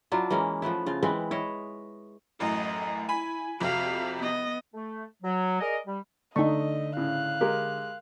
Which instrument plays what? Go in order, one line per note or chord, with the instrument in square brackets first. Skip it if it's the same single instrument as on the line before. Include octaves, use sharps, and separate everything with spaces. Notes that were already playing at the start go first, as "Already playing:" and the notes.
[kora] F#3 D4 E4 F4
E3 G#3 A#3 C#4
F3 A3 B3 E4
C#3 F4
E3 G#3 C4 B4
E4 C#5 D#5
[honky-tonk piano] A1 F#2 A2 [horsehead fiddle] D#5
[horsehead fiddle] E4 [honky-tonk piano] G#5 B5
[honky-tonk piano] F2 C3 [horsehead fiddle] F#4 F5
[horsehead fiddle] B3 D#5
[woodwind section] A3
F#3
G#4 A#4 D5 D#5
G3
[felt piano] D3 [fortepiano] A3 A4 [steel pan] D#4 C#6 [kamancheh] D#5
[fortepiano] A2 C#3 [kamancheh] F5 F#6
[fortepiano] G#3 G4 [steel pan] A#4